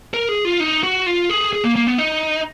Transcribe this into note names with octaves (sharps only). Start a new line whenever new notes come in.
A#4
G#4
F4
D#4
F#4
F4
G#4
G#4
A#3
A#3
B3
D#4